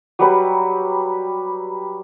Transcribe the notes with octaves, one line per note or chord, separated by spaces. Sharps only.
F#3 G3 B4